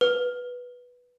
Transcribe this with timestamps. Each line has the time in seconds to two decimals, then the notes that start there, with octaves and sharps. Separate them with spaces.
0.01 B4